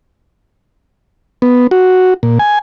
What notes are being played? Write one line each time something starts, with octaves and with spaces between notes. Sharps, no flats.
B3
F#4
A#2
G#5